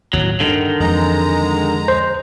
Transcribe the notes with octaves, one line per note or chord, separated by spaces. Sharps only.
D#2 A2 F#3
G2 D3 D#3
F2 E3 G#3 A#5
C5